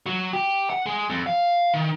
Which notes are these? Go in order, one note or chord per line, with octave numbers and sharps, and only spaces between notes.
F#3
G4
F#5
G#3
F2
F5
D#3